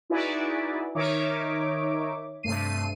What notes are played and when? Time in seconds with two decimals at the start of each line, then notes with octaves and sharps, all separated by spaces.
0.10 D#4 E4 F#4 G#4 B4 D5
0.95 D#3 D#4 C#5 E5 D6
2.43 G2 C3 A3 C7 D#7